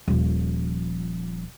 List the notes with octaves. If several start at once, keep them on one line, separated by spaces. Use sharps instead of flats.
D#1 F3